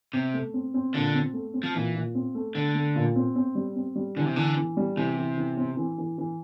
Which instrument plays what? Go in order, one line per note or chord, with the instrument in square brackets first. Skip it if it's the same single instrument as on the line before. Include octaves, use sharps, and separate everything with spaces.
[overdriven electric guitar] C3 [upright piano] C4
[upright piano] A3
C4
C4
[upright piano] A#2 [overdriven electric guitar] D3
[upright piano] C4
A3
C4
[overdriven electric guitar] F3
[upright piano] A#2 [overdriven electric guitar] E3
[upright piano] A#2
C4
A3
[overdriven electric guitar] D3 [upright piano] A3
[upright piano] A3
A#2
C4
C4
G3
C4
G3
[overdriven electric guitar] D3 [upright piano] E3
[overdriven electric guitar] C3
[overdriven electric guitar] D3 [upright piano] E3
[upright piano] E3
G3
[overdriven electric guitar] C3 [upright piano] E3
[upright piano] E3
E3
C4
E3
E3
E3